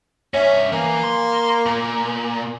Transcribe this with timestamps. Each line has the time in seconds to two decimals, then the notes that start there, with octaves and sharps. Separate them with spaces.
0.34 G2 C#4 E5
0.72 E3 A#3
1.03 C6
1.66 A#2